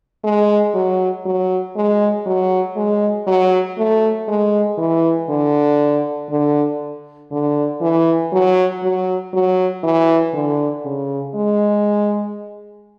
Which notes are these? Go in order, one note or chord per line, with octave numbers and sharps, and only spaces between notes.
G#3
F#3
F#3
G#3
F#3
G#3
F#3
A3
G#3
E3
D3
D3
D3
E3
F#3
F#3
F#3
E3
D3
C#3
G#3